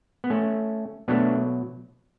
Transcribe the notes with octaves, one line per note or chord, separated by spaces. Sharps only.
B3
A3 C#4
B2 F#3 A3 B3 D4